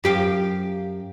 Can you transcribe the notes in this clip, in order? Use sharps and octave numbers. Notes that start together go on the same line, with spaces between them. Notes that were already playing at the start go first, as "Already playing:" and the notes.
F#2 G4 F5